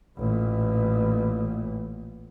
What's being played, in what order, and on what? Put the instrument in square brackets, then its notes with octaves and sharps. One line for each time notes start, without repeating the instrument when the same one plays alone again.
[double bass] A1 A#2